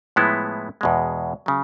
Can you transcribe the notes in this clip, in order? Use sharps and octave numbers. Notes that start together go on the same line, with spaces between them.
A2 F3 G#3 B3 E4
E2 B2 G#3
C#3 F#3